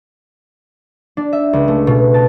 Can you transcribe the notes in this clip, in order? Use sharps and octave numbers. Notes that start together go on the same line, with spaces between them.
D4
E5
C#2
A3
B2
A5